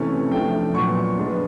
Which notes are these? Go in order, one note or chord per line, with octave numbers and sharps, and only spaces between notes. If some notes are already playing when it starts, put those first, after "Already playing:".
Already playing: C3 E3 A3 C#4
F3 A3 D4 G5
A#2 F#3 B3 C#6
F3 G#3 B3 D4